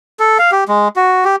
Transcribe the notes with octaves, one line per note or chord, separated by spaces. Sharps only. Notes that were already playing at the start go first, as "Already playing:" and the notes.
A4
F5
G4
G#3
F#4
G4